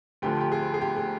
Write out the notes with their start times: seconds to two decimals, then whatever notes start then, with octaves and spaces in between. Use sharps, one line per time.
0.22 D2 D3 F3 G4
0.41 G4
0.52 G#4
0.74 G#4
0.81 G4
0.96 G#4